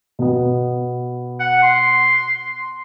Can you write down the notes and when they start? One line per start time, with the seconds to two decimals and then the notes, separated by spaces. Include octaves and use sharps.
0.19 B2 B3
1.40 F#5
1.63 C6